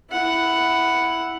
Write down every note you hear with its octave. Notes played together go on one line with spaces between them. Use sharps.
E4 F#5